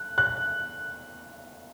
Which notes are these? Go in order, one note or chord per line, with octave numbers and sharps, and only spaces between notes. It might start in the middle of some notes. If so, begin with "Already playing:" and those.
Already playing: F#6
F#6